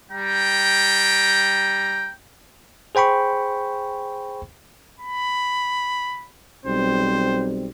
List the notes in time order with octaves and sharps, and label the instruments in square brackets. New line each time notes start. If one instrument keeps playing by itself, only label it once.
[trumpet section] G3 G5 A#5
[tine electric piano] G#4 C5 G5 B5 C#6
[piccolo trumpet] B5
[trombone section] B1 G3 C4 [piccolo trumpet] C5